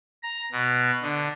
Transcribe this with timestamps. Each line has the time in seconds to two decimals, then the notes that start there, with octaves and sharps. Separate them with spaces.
0.23 A#5
0.52 B2
1.02 D3